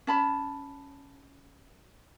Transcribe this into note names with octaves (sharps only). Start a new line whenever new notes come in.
C#4 A5 B5